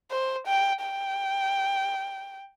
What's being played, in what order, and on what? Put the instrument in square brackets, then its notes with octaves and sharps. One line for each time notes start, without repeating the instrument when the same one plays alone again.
[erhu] C5
G5
G5